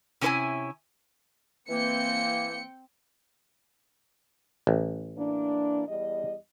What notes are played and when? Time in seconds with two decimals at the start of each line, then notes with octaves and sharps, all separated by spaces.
0.21 C3 C#4 E4 B4 E5 G#5
1.70 E3 A#3 C4 G5 C#7
4.67 A1
5.17 E3 A#3 D4
5.88 E2 G3 D#5